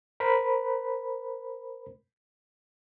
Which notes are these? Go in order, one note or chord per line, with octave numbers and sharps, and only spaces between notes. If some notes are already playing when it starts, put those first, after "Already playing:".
A#4 C5 B5